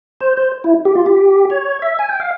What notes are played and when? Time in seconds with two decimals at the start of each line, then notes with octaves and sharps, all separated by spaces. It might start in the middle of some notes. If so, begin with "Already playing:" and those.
0.21 C5
0.37 C5
0.64 E4
0.85 G4
0.95 F4
1.06 G4
1.50 C#5
1.82 E5
1.99 G#5
2.09 G5
2.20 F5